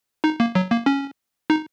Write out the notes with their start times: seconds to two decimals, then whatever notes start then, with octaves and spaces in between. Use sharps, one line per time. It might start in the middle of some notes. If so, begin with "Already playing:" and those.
0.24 D#4
0.40 A#3
0.55 F#3
0.71 A#3
0.86 C#4
1.50 D#4